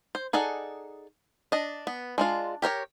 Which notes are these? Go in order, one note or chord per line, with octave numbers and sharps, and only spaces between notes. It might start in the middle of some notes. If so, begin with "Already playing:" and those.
C5
D#4 G#4 A4 D5 F#5
D4 D#5
B3
G#3 D4 F4
G4 A#4 C5 C#5